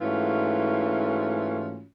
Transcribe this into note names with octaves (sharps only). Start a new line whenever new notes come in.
G#2 E3 A3 C#4 F4 F#4